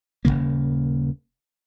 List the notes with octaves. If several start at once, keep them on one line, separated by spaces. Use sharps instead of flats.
D#1 F#2 C#3 A#3